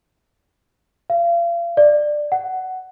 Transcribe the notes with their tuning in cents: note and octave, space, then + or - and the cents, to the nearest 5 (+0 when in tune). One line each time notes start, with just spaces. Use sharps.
F5 -35
D5 +15
F#5 +10